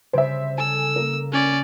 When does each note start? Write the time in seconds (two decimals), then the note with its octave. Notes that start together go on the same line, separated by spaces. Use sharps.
0.13 C#3 G3 C5 E5 D7
0.58 A4 G#5 E6
0.96 A#3 A#4
1.32 C#4 D5